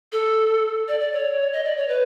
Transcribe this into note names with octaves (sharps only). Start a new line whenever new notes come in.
A4
D5
D5
C#5
D#5
D5
C#5
B4